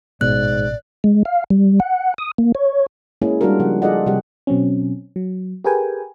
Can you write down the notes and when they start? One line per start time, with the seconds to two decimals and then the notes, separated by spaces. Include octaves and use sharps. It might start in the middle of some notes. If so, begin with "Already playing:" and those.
0.21 A1 G#2 B2 B3 D5 F#6
1.04 G#3
1.25 F5
1.50 G3
1.80 F#5
2.18 D#6
2.38 A#3
2.55 C#5
3.22 G#3 A#3 C#4 E4 G#4
3.41 G3 G#3 D4 F4 F#4 A#4
3.60 C#3 F3 F#5
3.82 F4 G#4 A4 D5 D#5 F#5
4.06 C3 G3 G4 F#5
4.47 B2 F#3 C4 C#4
5.16 F#3
5.64 G4 G#4 A#4 B4 G5 G#5